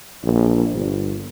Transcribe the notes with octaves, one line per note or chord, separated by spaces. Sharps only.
A#1
G1